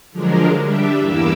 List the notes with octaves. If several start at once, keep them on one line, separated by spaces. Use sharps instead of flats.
D3 F3 F#3 G#3 D4 A#4
G3 D4 G4 E5
E2 G2 A#3 E4 D6 E6